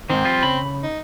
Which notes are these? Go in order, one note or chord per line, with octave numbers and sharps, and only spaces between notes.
G#2 D#3 C4
F3 G3 F4
C#3 B5
D#4